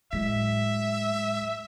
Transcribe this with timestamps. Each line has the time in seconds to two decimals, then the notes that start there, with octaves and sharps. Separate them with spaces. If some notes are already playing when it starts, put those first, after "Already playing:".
0.13 A2 F#3 G#3 E5 B6